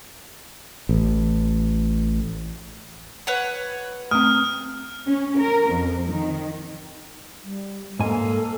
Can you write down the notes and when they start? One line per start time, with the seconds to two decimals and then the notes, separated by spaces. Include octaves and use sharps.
0.89 A1
3.27 B4 C#5 F#5
4.11 A3 C4 D#6 F6
5.07 C#4
5.39 A#4
5.70 F2
6.09 D#3
7.43 G3
7.99 G#2 A#3 A4 G#5